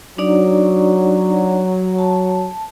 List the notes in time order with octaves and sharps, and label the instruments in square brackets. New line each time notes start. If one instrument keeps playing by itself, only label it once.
[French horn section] F#3 [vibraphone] D4 D#4 D5
[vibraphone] A5